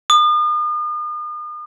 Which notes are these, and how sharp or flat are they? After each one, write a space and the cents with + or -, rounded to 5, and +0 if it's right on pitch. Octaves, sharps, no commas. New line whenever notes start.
D#6 -40